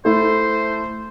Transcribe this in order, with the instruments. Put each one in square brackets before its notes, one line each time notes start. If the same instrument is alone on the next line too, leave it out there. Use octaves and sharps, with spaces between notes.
[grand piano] A3 E4 A4 [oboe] C5